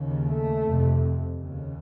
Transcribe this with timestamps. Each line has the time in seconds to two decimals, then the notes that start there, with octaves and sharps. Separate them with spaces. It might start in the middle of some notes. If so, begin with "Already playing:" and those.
Already playing: D#2 C#3
0.28 A3
0.64 F2 C3
1.37 D#2 C#3